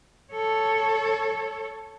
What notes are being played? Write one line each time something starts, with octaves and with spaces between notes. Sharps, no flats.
A4 C#5